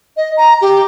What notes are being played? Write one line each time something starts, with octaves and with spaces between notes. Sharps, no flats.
D#5
A#5
G4